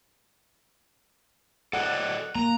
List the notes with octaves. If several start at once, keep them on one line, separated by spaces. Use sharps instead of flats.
A4 D5 D#5 F#5
A#3 A#5